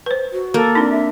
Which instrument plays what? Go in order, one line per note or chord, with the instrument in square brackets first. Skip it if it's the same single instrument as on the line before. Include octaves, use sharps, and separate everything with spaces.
[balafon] B4 C5
[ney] F#4
[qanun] A#3 [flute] A4
[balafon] C4 D#4 [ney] D4
[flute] E5